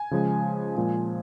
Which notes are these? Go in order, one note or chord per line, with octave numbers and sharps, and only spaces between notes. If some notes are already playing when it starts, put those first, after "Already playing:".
Already playing: G#5
C#3 F3 G#3
A#2 F3 G#3